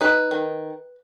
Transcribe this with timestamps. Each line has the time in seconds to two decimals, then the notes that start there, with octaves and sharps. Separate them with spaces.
0.01 D#4 B4
0.31 D#3